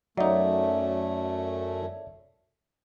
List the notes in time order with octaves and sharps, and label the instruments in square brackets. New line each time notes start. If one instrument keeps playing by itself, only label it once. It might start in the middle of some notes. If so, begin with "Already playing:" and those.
[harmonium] F#2 A3 [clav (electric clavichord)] F#3 D#4 [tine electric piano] C#5 D5 E5